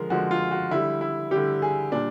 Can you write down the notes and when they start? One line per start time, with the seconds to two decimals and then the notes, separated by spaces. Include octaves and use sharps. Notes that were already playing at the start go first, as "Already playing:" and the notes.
Already playing: D3 F3 G#3 A#4
0.10 D3 F3 G#3 F#4
0.31 F4
0.51 F#4
0.71 D3 G3 E4
1.01 E4
1.31 D3 G3 G4
1.62 G#4
1.92 A#2 G3 D4